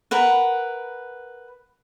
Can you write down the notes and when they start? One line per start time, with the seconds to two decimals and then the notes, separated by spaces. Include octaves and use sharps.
0.11 A#4 B4 F#5